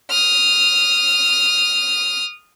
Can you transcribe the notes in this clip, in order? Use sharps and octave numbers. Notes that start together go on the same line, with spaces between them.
D#6 F6